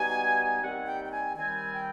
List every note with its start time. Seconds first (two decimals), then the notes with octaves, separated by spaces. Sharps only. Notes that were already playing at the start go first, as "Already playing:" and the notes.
Already playing: B2 G3 B3 D#4 G#5
0.61 D#2 D#3 G3 C4 F#5
0.87 G5
1.05 G5
1.11 G#5
1.37 D#2 D#3 G3 C4 G#5
1.74 G5